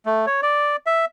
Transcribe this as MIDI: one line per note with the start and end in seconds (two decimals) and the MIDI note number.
0.06 0.26 57
0.27 0.41 73
0.42 0.76 74
0.86 1.05 76